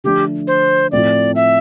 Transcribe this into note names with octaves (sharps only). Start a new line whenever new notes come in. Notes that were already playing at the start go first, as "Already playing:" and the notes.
D3 F3 A3 D4 G4
C5
A2 F3 A3 C4 F4 D5
E5